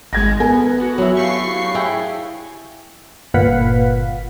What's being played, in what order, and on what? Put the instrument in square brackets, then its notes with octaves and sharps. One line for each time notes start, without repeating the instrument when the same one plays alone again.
[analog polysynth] G#1 G#3 [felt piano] G#6 A#6
[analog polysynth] B3 [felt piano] A4 A#4 G#5
[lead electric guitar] F#4
[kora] F#3 E4
[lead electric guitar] G4 F5 [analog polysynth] C#6 C7
[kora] E4 G#4 G5
[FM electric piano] G1 A#2 B4 F5 F#5 B6